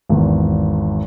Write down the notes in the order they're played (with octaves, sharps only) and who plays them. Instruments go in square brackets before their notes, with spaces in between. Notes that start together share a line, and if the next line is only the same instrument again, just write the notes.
[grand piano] G#1 E2